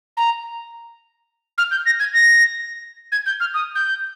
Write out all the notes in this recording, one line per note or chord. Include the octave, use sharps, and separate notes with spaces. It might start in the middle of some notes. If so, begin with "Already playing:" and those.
A#5
F6
G6
A#6
G#6
A#6
G#6
G6
F6
D#6
G6